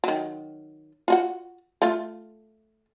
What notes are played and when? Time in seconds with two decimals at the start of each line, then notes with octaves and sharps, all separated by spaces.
0.04 D#3 F#3
1.08 F4 F#4 F#5
1.82 A3 F4